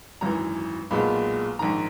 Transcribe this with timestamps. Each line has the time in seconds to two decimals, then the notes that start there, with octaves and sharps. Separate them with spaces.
0.21 G#1 F#2 E3 A#5
0.91 B1 A#2 G#3 B3 B5
1.59 A#1 G#2 D#3 A#5